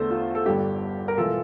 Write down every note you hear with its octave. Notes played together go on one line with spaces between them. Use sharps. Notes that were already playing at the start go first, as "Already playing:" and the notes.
Already playing: E2 D3 A3 A4 C5
F4
A4
G1 G2 D3 G4
A#4
E1 E3 F4 A4